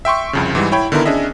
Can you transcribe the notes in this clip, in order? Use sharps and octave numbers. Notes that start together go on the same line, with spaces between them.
E5 G5 C6 C#6
C2 F2 C#3
G#2 E3 G3
E4 C#5 G5 B5
D3 D#3 B3 E4 A#4
C#4 D4 G#4 D#5 E5